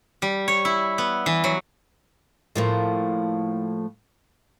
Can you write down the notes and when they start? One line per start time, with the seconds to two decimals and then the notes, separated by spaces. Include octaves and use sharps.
0.22 G3
0.48 C#5
0.65 E4
0.98 B3
1.26 E3
1.44 F#3
2.56 A2 F3 A#3